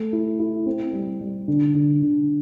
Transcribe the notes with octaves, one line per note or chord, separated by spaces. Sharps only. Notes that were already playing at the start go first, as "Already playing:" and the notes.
Already playing: A3
E4
E4
C4
G3
G3
D3
D3
D3